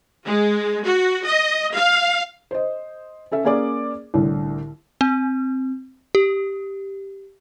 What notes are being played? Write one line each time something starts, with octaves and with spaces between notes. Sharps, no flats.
G#3
F#4
D#5
F5
C5 D#5
C#4 A4 E5
A#3 C#4 G#4 D5 D6
C2 A2 D3
C4
G4